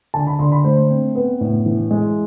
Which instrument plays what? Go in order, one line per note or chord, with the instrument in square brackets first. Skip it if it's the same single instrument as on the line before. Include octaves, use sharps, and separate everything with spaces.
[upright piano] D3 A5
B5
D3 C6
B5
A3 C5
C4
B3
A2
E3
G#3